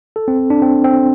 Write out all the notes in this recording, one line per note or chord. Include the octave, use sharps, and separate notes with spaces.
A4
C4
D4
C4
C4